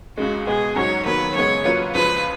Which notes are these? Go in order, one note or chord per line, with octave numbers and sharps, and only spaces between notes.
C#2 C#3 G#3 F#4
B2 G#3 B3 G#4
G#2 F#3 C#4 F#4 C#5
D#2 D#3 F#3 B3 B4
F#2 C#3 G#3 B3 C#5
F#3 A#3 C#4 F4 B4
C#2 C#3 F3 B4